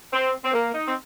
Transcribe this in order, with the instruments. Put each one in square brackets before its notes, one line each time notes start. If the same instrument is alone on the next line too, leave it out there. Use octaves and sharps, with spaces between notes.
[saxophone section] C4
C4
A#3
D#4
C4